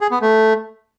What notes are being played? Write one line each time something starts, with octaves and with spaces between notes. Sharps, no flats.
G#4
B3
A3